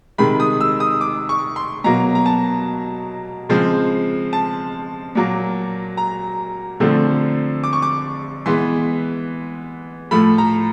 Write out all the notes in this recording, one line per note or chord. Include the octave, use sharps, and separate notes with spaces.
C3 D#3 G#3 B5
D#6
E6
D#6
D6
C#6
C6
B2 F#3 A#3 A#5
A#5
A5
C#3 F3 G#3 C4
A5
A#2 F#3 A#3
A#5
D3 F3 A3 C4
D6
C#6
D6
E3 G#3 B3 C6
A2 F3 A3 B5
A#5